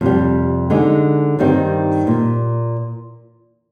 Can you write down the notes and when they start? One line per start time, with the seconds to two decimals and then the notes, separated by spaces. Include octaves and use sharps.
0.01 F2 C3 G3
0.70 D3 G#3 D#4
1.39 G2 D#3 G3 C4 D#4
2.07 A#2